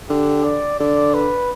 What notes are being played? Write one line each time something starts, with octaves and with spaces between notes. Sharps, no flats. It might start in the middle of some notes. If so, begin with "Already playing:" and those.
D3 G4
D5
D3 D5
B4